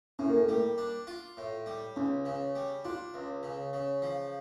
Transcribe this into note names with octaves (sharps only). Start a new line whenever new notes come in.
A2 C#4
A#3
A3
G3 A#3
D4
F4
A2
G3
C#2 C#4
C#3
G3
D4 F4
C#2
C#3
C#3
F3